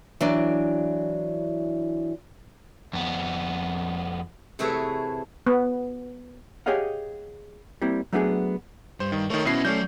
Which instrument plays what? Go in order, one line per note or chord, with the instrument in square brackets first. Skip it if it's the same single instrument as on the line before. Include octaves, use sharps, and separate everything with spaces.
[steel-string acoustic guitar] E3 F#3 D4
[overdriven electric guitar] F2 B3
[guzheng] C3 E3 A3 G#4 B4 C#5
[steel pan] B3
[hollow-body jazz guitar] G4 G#4 C#5 D#5 F5 F#5
G3 A#3 C4 E4
F#3 A3 B3 D4 G4 G#4
[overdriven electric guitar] G2 [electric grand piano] C5
[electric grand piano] D#3
[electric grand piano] D#3 A3 [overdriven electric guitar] A#4 C#5
[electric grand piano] B2 E4 C7 [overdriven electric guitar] B3 C#4
[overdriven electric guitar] F#3 D5 [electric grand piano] A3 C#4 G6